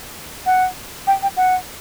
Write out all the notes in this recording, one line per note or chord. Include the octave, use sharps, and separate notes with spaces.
F#5
G5
G5
F#5